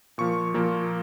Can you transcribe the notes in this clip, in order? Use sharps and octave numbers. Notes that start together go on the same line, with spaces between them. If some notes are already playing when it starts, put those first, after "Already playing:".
A#2 F3 A#3 C#6
A#2 F3 A#3